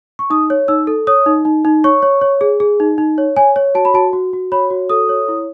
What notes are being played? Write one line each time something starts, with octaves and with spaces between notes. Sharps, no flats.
C#6
D#4 D#6
C#5
D#4 E6
A4
C#5 D#6
D#4
D#4
D#4
C#5 C#6
C#5
C#5
G#4
G#4
D#4
D#4
C#5
C#5 G#5
C#5
F#4 A5
B5
F#4 A5
F#4
F#4
C#5 B5
F#4
A4 D#6
C#5
E4